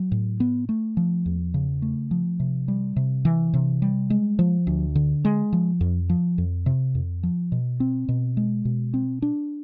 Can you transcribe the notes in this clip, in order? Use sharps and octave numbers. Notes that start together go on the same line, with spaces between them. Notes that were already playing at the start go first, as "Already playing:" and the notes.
Already playing: F#3
A2
B3
A3
F3
E2
C#3
A3
F3
C3
G3
C3
E3
C3
G3
G#3
F3
D2
D3
G#3
F3
F2
F3
F2
C3
F2
F3
B2
C4
B2
G#3
B2
C4
D4